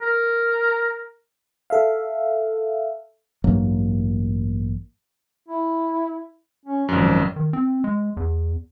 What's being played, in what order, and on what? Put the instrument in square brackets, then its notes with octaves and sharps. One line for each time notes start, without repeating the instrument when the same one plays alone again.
[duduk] A#4
[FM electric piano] A4 E5 F5
[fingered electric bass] A1 G2 F#3 A#3
[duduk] E4
C#4
[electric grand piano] G#1 F#2 [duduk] F3
[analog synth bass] D#3
C4
G#3
E2